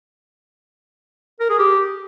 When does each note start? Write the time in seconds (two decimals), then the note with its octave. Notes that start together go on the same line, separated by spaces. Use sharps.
1.40 A#4
1.49 G#4
1.59 G4